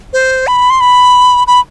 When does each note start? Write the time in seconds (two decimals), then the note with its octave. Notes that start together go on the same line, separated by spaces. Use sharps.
0.13 C5
0.47 B5
0.70 C6
0.80 B5
1.47 B5